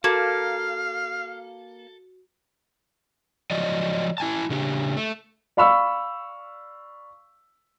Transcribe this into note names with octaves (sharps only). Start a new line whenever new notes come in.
A#3 F#4 A4 F5
F3 F#3 D5 D#5
E4 G#5 A5
C#3 D4 G4
A3
D5 F5 B5 C#6 E6